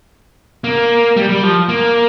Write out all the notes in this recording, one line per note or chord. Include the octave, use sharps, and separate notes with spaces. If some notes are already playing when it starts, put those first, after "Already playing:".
A#3
G3
G3
F3
A#3